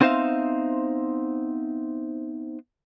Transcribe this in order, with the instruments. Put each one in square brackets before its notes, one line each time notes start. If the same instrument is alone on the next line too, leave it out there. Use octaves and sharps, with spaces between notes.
[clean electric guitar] B3 C4 D#4 C5 E5 F5